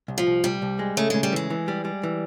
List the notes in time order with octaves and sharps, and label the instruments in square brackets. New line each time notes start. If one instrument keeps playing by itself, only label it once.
[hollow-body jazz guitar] C2
[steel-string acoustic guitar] F3
[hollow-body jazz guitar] C2
[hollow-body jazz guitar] C2 [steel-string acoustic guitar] G3
[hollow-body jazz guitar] C2
G#3
[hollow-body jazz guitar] C#3 [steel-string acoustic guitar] A3
[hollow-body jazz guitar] C#3 [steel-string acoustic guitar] G#3
[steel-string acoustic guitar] G3
[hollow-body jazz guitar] E3 [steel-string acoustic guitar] G#3
[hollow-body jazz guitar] E3
G3
G3
E3